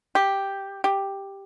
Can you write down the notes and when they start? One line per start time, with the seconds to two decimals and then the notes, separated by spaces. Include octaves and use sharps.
0.15 G4
0.84 G4